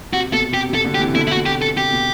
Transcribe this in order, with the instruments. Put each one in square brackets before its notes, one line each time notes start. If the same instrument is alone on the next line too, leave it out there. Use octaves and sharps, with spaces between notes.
[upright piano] C3 [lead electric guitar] F#4
[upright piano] B2 [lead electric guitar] A4
[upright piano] C3 [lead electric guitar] G4
[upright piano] C3
[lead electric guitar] A4
[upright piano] B2 D3
[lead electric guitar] G4
[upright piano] C3 E3
[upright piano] B2 D3 [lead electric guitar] E4
[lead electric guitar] E4
F#4
[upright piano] B2
[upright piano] C3 [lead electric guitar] G4
[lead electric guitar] A4
[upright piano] C3 [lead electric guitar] G4
[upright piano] B2